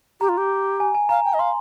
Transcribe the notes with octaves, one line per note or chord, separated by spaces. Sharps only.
G4 A#5
F4
G4
G#5
G#5
F5 A#5
G5
D#5
F5 C6